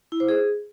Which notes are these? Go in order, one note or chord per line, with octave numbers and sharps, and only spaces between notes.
E4
C5
G#4